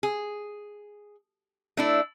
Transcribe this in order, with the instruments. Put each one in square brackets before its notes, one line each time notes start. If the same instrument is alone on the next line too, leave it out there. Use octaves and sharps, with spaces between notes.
[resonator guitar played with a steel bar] G#4
A3 D4 E4